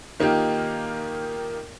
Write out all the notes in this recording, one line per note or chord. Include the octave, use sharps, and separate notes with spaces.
D#3 A#3 D#4 F4 G4